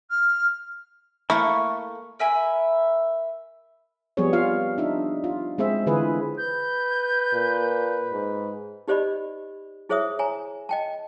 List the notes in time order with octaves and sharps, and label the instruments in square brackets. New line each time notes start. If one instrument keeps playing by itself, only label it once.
[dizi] F6
[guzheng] A3 A#3 [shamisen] E4 [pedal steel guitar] C#6
[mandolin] A#4 E5 G#5 B5
[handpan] F3 G3 B3 C4 G#4 C#5
F4 F5
D4 D#4 E5
F4
G#3 C4 G#4 C5 E5
D3 E3 F4 G#4 B4
[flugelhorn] B4 [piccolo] G6
[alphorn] A#2
G#2
[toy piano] D#4 G4 C5 D5 D#5 B5
E4 G#4 C5 C#5 E5 D#6
C#5 G#5 A#5
D#5 G5 A5